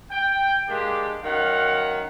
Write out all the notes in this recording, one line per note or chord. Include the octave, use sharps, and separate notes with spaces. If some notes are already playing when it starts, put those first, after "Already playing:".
G5
G#3 A#3 D4 G4
F#2 D#3 F5 F#5